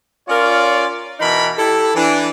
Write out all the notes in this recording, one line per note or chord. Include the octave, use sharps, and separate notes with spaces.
C#4 F4 A#4 C#5 D5
B2 E3 D#4 A#4 B5
E4 G4 A4
E3 D4